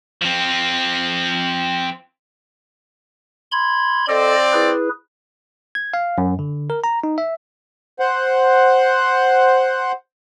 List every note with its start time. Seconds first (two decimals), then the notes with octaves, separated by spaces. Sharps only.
0.22 F3 C4
3.52 B5 C6 G#6
4.09 C4 F4 A4 D5 D#5
4.53 E4 G#4 B4
5.75 G#6
5.94 F5
6.18 F#2
6.39 D3
6.70 A#4
6.84 A#5
7.04 D#4
7.18 E5
8.00 C5 F#5